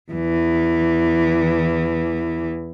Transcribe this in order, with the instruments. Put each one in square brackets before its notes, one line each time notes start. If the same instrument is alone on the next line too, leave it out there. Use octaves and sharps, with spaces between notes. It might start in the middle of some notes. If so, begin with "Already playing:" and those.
[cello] E2 E3